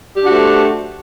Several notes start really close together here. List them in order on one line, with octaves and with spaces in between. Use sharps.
G4 D4 F#4 A3 C5